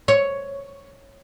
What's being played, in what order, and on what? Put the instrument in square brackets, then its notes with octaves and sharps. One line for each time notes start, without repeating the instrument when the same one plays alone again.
[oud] C#5